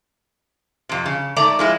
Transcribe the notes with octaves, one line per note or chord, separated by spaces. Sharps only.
F2 C3
C#3
G#2 A3 D5 A#5
F3 G#3 E4